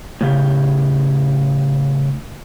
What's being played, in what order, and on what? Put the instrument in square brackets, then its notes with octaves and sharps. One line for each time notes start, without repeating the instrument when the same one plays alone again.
[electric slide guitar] A2 C#3 G4